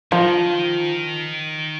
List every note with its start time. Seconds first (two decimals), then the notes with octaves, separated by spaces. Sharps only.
0.12 D#3 F3